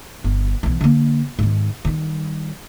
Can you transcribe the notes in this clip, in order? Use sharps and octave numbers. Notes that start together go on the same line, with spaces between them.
G1
B1 E3
D3 A#3
G#2 D#3
D#3 G3